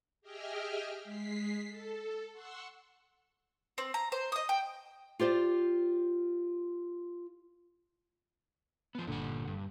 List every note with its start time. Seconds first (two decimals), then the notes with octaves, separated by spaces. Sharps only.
0.21 G4 G#4 D#5 E5 G5 F6
1.04 G#3 B6 C7
1.67 A4
2.32 F#5 C6 C#6 E6
3.78 C4
3.94 A#5
4.12 C5
4.32 D#5 D#6
4.49 G5
5.19 F4 G4 C5 D5
8.95 F3 B3
9.07 G1 A#2 D3 F#5
9.47 G2